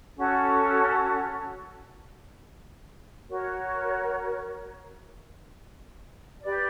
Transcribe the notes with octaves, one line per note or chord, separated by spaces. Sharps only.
C#4 F#4 A4
F#4 A#4 C#5
G4 B4 D5